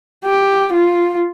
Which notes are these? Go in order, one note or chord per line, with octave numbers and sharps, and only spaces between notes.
G4
F4